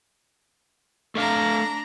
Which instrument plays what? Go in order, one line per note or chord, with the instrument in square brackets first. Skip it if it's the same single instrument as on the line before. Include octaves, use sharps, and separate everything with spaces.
[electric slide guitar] A3 E5 F5 [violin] D4 A#5